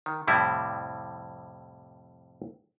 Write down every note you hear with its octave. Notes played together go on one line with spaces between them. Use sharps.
D#3
F2 A2 C3 G3 C4 E4